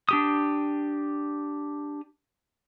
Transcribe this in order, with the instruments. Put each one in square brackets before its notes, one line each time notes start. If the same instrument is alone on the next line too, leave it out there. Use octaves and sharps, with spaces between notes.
[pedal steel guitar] D4 G4 D#6